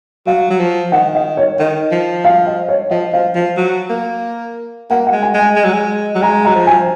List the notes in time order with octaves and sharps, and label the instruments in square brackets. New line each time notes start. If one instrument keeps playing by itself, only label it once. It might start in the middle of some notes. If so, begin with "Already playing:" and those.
[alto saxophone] F#3 [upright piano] F5
[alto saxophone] F#3
F3
[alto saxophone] D#3 [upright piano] F#5
[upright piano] D#5
C#5
[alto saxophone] D#3 [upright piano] D#5
[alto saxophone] F3
[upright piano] F5
D#5
C#5
[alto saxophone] F3 [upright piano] D#5
[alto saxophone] F3 [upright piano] F5
[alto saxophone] F3 [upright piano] F5
[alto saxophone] F#3
A#3
[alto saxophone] A#3 [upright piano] F#5
[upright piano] F#5
[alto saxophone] G#3
[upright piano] G#5
[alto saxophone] G#3 [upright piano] G#5
[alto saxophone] G#3
F#3
G#3
F#3
[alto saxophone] G#3 [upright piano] A#5
[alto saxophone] F#3 [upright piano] A#5
[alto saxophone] F3
[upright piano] G#5